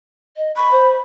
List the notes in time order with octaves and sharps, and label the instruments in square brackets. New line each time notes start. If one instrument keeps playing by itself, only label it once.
[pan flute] D#5
[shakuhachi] B5 [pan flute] C#6
[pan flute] C5